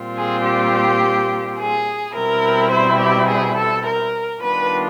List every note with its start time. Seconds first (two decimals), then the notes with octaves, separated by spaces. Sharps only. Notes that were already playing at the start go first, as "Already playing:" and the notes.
Already playing: A#2 G3 C4 F4
0.16 G#4
0.44 G4
1.58 G#4
2.15 B2 G3 C4 E4 A#4
2.71 C5
3.00 G4
3.28 G#4
3.56 A4
3.85 A#4
4.42 D#3 G3 B3 D4 F4 B4